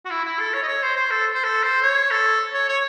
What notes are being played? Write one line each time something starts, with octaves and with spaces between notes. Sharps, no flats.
F#4
E4
E4
A4
C#5
D#5
C#5
C5
C5
A4
C5
A4
C5
C#5
A4
C#5
C#5